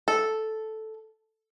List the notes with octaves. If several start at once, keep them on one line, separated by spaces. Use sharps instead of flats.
A4